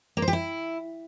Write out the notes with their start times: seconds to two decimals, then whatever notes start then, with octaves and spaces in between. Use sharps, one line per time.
0.17 A#3
0.22 C5
0.28 G4
0.33 E4